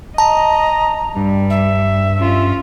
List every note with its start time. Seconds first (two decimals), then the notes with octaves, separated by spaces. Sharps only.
0.18 D#5 A5 A#5
1.16 G2 G3
1.50 E5
2.18 C#4 F4